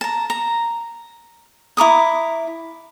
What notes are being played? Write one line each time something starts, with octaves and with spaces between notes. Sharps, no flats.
A5 A#5
A#5
E4 A#5 D6 D#6